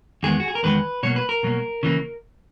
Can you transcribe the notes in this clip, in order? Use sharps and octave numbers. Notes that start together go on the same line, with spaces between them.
E2 D#3 G#3 B3 G#4
F#4
G#4
A#4
E2 D#3 G#3 B3 B4
B2 F#3 A#3 C#5
B4
A#4
B2 F#3 A#3
C#3 E3 A#3